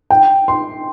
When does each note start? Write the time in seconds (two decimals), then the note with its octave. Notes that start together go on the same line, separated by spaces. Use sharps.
0.10 G5
0.48 C6